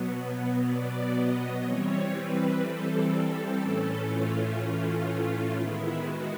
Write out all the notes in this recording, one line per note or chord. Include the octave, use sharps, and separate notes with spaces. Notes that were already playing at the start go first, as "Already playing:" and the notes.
Already playing: B2 F#3 B3
D5
D#5
E3 G3 C4 C#5
B4
A4
A4
A2 E3 A3 C#4
F4
F4
D#3 G#3 B3 E4
F#4